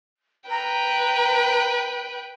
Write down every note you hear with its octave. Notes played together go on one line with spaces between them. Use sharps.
B4 G5 A#5